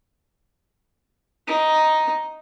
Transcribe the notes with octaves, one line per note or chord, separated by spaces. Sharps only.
D#4